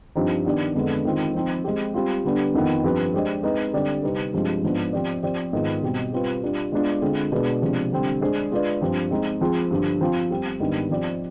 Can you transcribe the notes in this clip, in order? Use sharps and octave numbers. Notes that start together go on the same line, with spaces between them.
G2 F3 C4 D#4
D#3 B3 D4 G4 D5
F2 D3 G#3 B3 D4
D#3 G#3 C4 F4
F3 C4 D#4
G#3 C4 G4
G3 C4 F4
D3 G3 B3 D4
F2 D#3 B3 F4
G2 F3 C4 G4 B4
G#3 D4 G4 C5 D#5
G#3 C4 D#4 B4 D#5
D3 G3 C4 G4 D5
C3 G3 C4 D#4 B4
G2 F3 G#3 C4
G#2 F3 B3 D4
F3 C4 G4 D5
F3 C4 G4 D5
G#2 D#3 B3 F4 G#4
B2 G3 C4 G4
G3 C4 F4 B4
G3 D4 F4
G#3 B3 D4 F4
D3 G#3 C4 F4 G#4
B2 G#3 D4 G#4 B4
C3 F3 G#3 D4
D3 G3 C4
G#3 D4 G#4 C5
G#3 D4 F4 B4 D5
G2 F3 C4
G#3 C4 D#4 G#4
F3 C4 F4 G#4
G2 D3 F3
F3 C4 F4
G3 C4 G4
G#2 D#3 G3 B3 D4
F3 C4 G4 D5